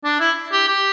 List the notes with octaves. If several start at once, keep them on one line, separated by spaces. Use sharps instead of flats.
D4
E4
G4
G4